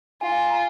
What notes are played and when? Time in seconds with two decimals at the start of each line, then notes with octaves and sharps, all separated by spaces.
0.21 F4 G#5
0.51 A#5